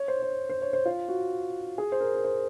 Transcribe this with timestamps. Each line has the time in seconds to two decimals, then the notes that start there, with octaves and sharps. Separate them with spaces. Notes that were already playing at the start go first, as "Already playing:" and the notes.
Already playing: C#5
0.08 C5
0.22 C#5
0.50 C5
0.62 C#5
0.73 C5
0.86 F4
1.08 F#4
1.78 G#4
1.92 C5
2.00 A#4
2.17 A#4
2.24 C5